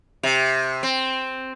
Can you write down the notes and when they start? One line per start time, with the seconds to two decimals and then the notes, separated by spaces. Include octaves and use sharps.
0.23 C3
0.83 C4